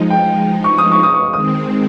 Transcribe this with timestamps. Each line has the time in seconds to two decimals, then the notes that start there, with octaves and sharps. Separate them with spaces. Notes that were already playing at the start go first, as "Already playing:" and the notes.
Already playing: F3 G#3 D#4
0.10 G5
0.64 C#6
0.78 D#6
0.92 C#6
1.03 D#6
1.14 C#6
1.33 D#3 G#3 C4 D#6